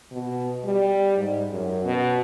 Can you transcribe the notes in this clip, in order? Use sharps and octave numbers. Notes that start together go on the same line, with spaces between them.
B2
G3
G#2
F#2
B2